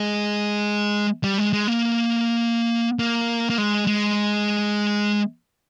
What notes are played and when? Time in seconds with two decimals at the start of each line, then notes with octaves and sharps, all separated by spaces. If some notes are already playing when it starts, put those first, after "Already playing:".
Already playing: G#3
1.24 G3
1.38 G#3
1.53 G#3
1.68 A#3
2.99 A#3
3.50 A#3
3.58 G#3
3.87 G#3